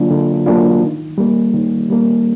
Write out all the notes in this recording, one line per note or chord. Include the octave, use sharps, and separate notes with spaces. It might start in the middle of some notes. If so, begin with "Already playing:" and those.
Already playing: D3 F#3 A#3 D4 F4
D3
F#3 A#3 D4 F4
D#3
G3 A#3
D#3
G3 A#3